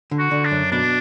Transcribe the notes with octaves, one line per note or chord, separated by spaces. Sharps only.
D3
F#4
D3
D4
F#2
B2 D4